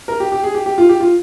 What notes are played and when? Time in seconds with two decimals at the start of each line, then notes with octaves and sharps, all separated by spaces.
0.08 A#4
0.20 G4
0.32 G4
0.44 G#4
0.54 G4
0.66 G4
0.78 F4
0.89 G4
1.00 F4